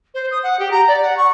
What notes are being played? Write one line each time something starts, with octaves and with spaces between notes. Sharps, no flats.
C5
D#6
F#5
G4
A#5
D5
F#5
C#6